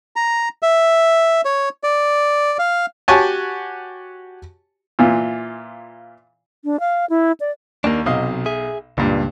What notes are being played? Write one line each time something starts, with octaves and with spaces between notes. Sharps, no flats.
A#5
E5
C#5
D5
F5
F#4 G4 C#5 G#5 A5
A#2 E3 F4
D4
F5
E4
D5
D#2 A#3 D4
B1 C3 F#3 D#5 F5
G#4 E5
C#2 G2 A#2